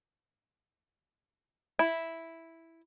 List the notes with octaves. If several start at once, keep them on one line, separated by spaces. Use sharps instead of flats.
E4